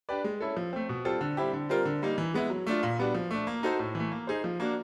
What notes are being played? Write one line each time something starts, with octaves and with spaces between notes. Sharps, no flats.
D4 G4 B4 D5
G#3
C#4 E4 A4
F3
A3 C4
B2
G3 C4 F4 A4
D3
G3 C4 E4 G4
D3
G3 C4 F4 A#4
D3
G3 A#3 D#4
E3
G#3 B3 E4
F#3
A3 D4 F4
A#2
G3 B3 D4 F#4
F3
A3 D4
A#3
D#4 F#4 A4 C5
A2
E3 A3
A#3
D#4 G#4 C5
F3
A#3 D4 F#4